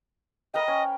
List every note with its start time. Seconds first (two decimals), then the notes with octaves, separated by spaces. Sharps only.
0.54 A#4 B4 D#5 G5
0.68 C#4